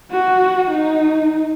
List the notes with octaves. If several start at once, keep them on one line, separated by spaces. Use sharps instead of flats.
F#4
D#4